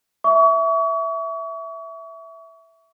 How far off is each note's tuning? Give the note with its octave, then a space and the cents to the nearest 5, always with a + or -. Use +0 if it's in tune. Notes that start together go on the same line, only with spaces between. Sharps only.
E5 +0 C#6 +35